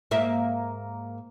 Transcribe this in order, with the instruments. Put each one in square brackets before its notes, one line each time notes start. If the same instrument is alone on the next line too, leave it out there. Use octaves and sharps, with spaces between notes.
[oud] G#2 A#3 E5